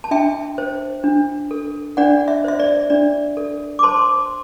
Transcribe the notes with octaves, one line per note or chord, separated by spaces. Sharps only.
A5
D4 E5 G5
C5
D4
A4
D4 D5 F#5
E5
C5 E5
D5
D4 D5
A4
D6
C5 A5 C6